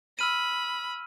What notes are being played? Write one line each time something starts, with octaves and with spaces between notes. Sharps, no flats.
B5 E6 F6 D#7